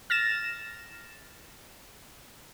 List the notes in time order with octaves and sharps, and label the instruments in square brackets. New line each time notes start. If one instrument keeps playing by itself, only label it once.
[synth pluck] F6 A6 A#6 E7